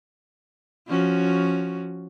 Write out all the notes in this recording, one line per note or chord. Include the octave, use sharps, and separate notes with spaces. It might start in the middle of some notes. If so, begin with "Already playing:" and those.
F3 C#4 F#4